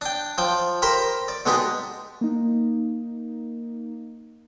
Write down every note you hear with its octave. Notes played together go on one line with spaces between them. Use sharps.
D4 G5
F3 G5 D6
G4 A#4 C5 A#5 B5
D5
B2 G#3 D4 D#4 G4
A#3 D#4